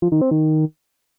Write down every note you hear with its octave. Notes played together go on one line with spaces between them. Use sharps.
F3
D#3
C4
D#3